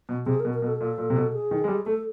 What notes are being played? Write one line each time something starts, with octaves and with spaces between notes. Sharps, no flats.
B2
C3 G#4
B2 A#4
A#4
B2
A4
A#2 A4
A#2
C3
B2
G#4
D#3
G#3
G3
A3 A4